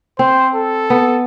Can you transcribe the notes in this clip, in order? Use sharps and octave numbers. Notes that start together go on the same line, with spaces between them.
C4 C5
A4
B3